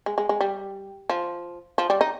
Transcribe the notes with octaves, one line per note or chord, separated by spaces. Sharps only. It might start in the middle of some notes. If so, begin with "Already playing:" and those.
G#3
G#3
G#3
G3
F3
F3
G3
D#4